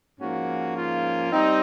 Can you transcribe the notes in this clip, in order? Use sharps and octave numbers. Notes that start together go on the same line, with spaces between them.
G#2 F3 A#3 C#4 F#4
F4
G3 C4 D#4